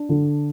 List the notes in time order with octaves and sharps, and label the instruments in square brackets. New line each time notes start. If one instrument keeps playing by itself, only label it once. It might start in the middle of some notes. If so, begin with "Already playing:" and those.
Already playing: [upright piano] D4
D3